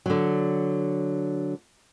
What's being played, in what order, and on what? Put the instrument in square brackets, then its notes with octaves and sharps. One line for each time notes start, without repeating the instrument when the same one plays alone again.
[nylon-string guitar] D3 F#3